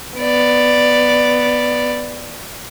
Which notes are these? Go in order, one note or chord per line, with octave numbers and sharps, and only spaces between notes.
B3 D5